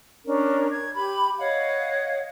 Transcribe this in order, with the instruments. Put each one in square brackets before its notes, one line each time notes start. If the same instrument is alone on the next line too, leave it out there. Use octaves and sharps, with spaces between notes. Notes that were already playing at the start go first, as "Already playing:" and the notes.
[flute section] C#4 D4 A#4
G#6
G4 B5
C#5 D#5 F5 F#5